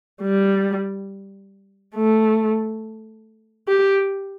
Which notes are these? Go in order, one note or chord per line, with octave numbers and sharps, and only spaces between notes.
G3
A3
G4